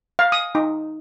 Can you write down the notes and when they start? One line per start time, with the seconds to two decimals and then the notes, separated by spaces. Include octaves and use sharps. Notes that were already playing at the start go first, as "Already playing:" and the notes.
0.19 F5
0.32 D#6
0.55 D#4